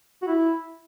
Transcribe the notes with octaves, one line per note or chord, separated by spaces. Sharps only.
F#4
E4